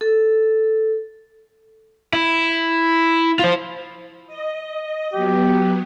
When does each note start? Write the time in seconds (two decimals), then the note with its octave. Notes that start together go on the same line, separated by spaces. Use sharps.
0.01 A4
2.13 E4
3.39 F4 C5
4.27 D#5
5.14 F#3 B3 G4